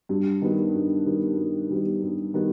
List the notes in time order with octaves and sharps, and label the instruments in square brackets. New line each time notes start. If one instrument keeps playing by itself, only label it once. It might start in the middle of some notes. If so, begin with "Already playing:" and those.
[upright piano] G2
D#3 G3 B3
G2
D#3 G3 B3
G2
D#3 G3 B3
G2
D#3 G3 B3